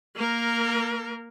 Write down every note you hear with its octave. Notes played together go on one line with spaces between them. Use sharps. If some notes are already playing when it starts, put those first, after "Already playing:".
A#3 A#4